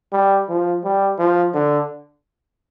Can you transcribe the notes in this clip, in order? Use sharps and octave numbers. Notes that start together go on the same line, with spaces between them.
G3
F3
G3
F3
D3